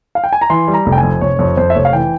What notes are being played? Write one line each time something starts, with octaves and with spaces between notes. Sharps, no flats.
F5
G5
G#5
A#5
E3 C6
G3
A#5
F1
G5
G#5
F2
F1 C#5
F2 C#5
F2 C5
E5
F1 C#5
F5
E3 G5